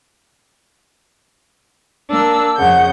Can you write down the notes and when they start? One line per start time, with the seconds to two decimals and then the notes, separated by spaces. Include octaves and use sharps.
2.11 A#3 D4 E6
2.58 F2 C#3 F#5 G6